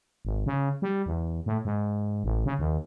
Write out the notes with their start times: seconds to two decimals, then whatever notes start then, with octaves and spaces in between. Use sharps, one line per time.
0.25 G#1
0.46 C#3
0.82 G3
1.06 E2
1.46 A2
1.65 G#2
2.24 A1
2.46 C#3
2.59 D#2